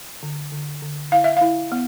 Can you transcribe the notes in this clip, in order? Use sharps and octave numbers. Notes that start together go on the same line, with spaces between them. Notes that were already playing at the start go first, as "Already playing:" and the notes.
D3
D3
D3
E4 F5
E5
E4 F5
B3